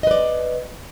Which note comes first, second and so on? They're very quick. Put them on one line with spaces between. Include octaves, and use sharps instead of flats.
D#5 B4 D5